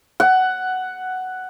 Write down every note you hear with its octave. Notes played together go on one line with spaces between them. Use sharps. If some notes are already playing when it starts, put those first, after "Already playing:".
F#5